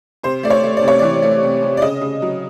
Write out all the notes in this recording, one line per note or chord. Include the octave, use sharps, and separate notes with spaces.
C3 C5
A3 D5
C#5
A3
D5
C3
C#5
E3 D5
A3
C3
C3
D5
C#3 D#5
C#3
F#3